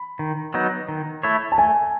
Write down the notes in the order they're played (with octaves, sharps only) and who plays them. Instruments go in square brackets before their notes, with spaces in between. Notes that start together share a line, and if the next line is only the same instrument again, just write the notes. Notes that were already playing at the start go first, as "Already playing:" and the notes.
Already playing: [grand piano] B5
[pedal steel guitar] D#3
F#3 B3 D#4
D#3
A3 E4 A4 C#5
[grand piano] A5
[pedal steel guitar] A3 [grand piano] G#5